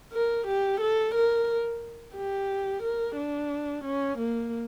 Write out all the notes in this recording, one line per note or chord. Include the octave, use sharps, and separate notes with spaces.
A#4
G4
A4
A#4
G4
A#4
D4
C#4
A#3